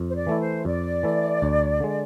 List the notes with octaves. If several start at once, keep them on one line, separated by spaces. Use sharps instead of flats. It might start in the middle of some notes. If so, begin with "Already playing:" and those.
Already playing: F2
C5
D5
E3 A3 E4
C5
F2 D5
E3 A3 E4
D2
D3 G#3